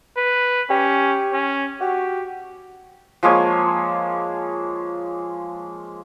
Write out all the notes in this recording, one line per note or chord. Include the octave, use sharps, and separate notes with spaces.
B4
C#4 G4
C#4
F#4 G4
F3 G#3 A#3 C#5